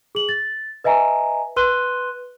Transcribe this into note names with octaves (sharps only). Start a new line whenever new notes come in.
G#4 F#7
A6
B4 D#5 E5 G#5 A#5
B4 C6 F#6 D#7 G7